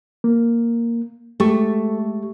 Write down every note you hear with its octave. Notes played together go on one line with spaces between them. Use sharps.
A#3
G#3 A3 G4 C#6